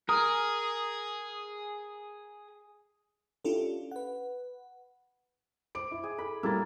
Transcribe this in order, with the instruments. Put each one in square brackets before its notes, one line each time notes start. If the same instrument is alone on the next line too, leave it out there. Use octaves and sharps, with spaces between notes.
[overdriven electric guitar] G#4 [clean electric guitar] A#4 [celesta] D#6
[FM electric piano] C#4 D4 E4 F4 G4 A4
B4 F#5
[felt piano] C5 D6 D7
E4
[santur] G#4
[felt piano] A4 [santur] B5
[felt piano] A2 G3 A6 [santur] A#3 E4 A4